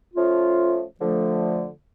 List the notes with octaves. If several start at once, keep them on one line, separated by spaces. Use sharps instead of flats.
F3 A3 C#4 F4
D3 F3 A3